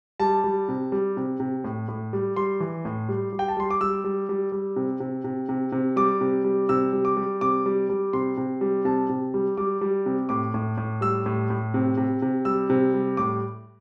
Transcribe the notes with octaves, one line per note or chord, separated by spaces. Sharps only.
G3 A5
G3
C3
G3
C3
C3
A2
A2
G3
G3 C6
E3
A2
G3
G3
G5
A5
G3 C6
D6
G3 E6
G3
G3
G3
C3
C3
C3
C3
C3
G3 D6
C3
G3
C3 E6
G3
D6
G3
C3 D6
G3
G3
C3 C6
C3
G3
C3 A5
C3
G3
G3 D6
G3
C3
A2 D6
A2
A2
G3 E6
A2
A2
C3
C3
C3
G3 E6
C3
G3
A2 D6